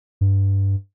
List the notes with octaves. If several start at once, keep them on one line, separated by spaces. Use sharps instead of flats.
G2